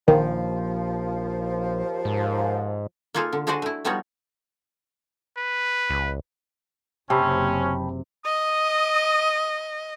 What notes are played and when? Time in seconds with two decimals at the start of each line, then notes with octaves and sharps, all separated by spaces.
0.08 A#1 D#2 D#3 F3
2.05 G#2
3.14 A#3 D#4 F4 G#4 A4
3.33 D3
3.47 G#3 D4 F#4 C5 D5 D#5
3.62 A3 E4
3.85 F3 G3 B3 D#4 F#4 C#5
5.37 B4
5.90 C#2
7.10 F#1 C3 C4 C#4 G5 A5 B5
8.25 D#5 D#6